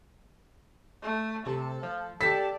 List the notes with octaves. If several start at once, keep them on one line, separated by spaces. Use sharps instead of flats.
A3
C3 A4
F3
G4 A4 D5 A5 B6